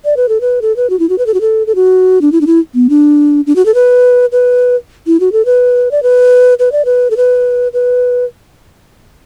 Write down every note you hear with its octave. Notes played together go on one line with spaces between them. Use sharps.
D5
B4
A4
B4
A4
B4
F#4
E4
F#4
B4
A4
F#4
A4
A4
F#4
D4
E4
D4
E4
B3
D4
D4
F#4
A4
B4
B4
E4
F#4
A4
B4
D5
B4
B4
D5
B4
A4
B4
B4